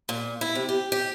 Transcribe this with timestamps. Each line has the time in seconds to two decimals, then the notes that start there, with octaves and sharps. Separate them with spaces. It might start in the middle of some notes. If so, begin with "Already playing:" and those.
0.09 A#2
0.41 E4
0.55 C3
0.69 G4
0.92 G4